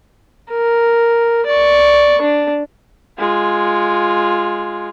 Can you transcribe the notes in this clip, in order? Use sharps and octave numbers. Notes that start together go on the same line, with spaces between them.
A#4
D5 C#6
D4
G#3 F4